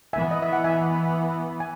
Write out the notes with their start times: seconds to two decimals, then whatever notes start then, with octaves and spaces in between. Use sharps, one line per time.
0.13 E3 B3 E5 G#5
0.31 D#5
0.42 E5
0.53 F#5
0.64 E5 G#5
1.60 G#5